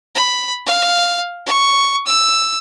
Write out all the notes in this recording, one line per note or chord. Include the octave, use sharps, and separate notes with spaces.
B5
F5
C#6
E6